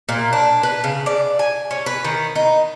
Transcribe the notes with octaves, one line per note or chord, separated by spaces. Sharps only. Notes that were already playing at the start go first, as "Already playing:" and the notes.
A#2
D4
B4
C#3
D5
G#5
C#4
B4
D#3
D#4